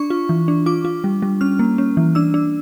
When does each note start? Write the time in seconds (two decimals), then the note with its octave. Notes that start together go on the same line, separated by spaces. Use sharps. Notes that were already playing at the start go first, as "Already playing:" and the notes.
Already playing: D4 C#6
0.10 F4
0.29 E3
0.48 D4
0.66 F4 D6
0.85 F4
1.04 G3
1.22 G3
1.41 C#4 F6
1.59 A#3
1.78 C#4
1.97 E3
2.15 D4 E6
2.34 D4